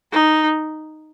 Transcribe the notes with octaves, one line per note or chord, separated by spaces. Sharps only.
D#4